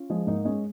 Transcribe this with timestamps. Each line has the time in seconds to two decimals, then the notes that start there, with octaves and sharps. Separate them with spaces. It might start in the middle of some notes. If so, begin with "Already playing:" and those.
Already playing: C#4 F4
0.10 F3 G#3
0.27 G#2 A#3 D#4
0.45 G#3 C#4